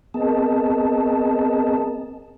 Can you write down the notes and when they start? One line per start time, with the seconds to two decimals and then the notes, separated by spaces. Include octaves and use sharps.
0.14 B3 C4 G#4 A#4 D#5 A5